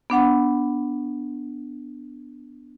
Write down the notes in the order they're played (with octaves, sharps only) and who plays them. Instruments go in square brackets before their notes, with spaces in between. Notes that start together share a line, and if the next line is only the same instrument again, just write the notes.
[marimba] B3 D4 F#5 B5